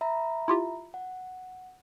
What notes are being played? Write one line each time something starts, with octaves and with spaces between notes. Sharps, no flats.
E5 A#5 B5
E4 F4 G4
F#5